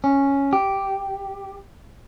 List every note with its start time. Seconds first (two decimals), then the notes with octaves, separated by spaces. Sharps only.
0.04 C#4
0.53 G4